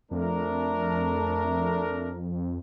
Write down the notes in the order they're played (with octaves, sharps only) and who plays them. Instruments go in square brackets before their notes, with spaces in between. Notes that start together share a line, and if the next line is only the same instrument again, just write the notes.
[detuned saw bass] F2 [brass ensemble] A3 D4 A#4